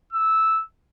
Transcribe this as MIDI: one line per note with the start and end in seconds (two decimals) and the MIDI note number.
0.13 0.61 88